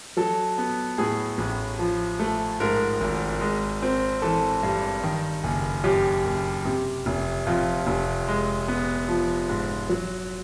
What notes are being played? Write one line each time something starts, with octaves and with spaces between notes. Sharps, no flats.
F#3 A4
B3
A2 G#4
A1
F3
A3
G#2 A#4
G#1
G#3
C4
E3 A4
G2
D#3
F#1
F#2 G4
F#1
C3
F1
F2 F4
F1
G#3
B3
F3
G#2
F#3